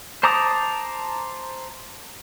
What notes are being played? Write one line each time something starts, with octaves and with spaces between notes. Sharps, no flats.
C5 A5 A#5 D6 D#6